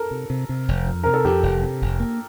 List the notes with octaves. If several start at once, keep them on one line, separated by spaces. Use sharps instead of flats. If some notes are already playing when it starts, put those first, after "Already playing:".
Already playing: A4 A#4
C3
C3
C3
F1
F2
C3 A#4
A4
F2 G4
F1
C3
F1
A#3